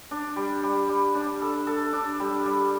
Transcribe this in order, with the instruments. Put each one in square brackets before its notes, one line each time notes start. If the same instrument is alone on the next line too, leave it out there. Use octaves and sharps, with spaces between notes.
[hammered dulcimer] D4
G3
G3
G3
D4
A4
A4
D4
G3
G3